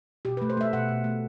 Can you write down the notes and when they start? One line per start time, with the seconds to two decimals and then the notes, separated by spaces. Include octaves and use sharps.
0.25 B2 G4
0.37 B4
0.42 A3
0.50 C5
0.57 A3 E5
0.73 B2 F#5
0.89 B2
1.04 A3